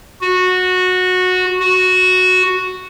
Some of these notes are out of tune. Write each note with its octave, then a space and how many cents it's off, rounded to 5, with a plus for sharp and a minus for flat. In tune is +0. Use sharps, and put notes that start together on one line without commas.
F#4 -15
F#4 -5